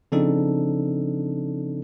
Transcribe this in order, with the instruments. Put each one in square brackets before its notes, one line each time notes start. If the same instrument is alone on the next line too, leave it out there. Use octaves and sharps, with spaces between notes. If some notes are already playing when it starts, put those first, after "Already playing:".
[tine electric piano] C#3 F3 C4 D4 D#4 A4